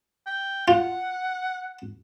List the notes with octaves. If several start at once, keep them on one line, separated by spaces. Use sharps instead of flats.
G5
F4 F#5